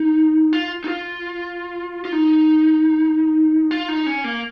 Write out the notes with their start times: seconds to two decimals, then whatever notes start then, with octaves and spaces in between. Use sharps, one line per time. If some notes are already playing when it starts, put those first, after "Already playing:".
Already playing: D#4
0.53 F4
0.84 D#4
0.88 F4
2.05 F4
2.12 D#4
3.71 F4
3.88 D#4
4.07 C#4
4.24 A#3